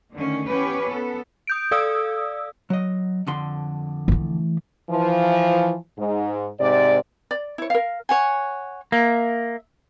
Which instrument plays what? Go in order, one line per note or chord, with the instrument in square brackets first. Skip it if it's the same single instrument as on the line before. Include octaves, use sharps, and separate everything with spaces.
[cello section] D3 D#3 A3 C#4
E3 B3 C#4 G4 B4 C#5
B3 A4
[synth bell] D#6 G6 D7
A4 D5 F5 D#6 E6
[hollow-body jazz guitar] F#3 D#5
F2 D3 C6
[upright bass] E3 A3
[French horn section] E3 F3
G#2
G#2 C3 D5
[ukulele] D5
E4 C#5
A#4 F5
[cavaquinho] C#5 F#5 G#5
[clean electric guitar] A#3 [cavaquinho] E5